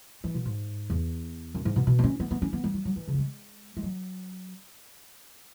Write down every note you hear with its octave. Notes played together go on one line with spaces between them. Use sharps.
E3
B2
G#2
E2
F#2
G#2
B2
B2
B3
C#4
B3
B3
C#4
B3
G#3
F#3
F#3
E3
C#3
B3
G#3
G#3
F#3